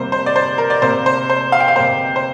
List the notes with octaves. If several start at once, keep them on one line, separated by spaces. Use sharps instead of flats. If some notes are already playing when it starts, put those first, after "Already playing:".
Already playing: C3 G3 A#3 C5
C5
D5
C5
A#4
D5
C3 A#3 C5
C5
C5
F5
G5
F5
C3 A#3 C5
C5